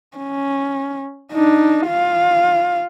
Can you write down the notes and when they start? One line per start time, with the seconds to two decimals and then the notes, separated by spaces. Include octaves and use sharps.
0.17 C#4
1.32 D4 D#4
1.87 F4 F5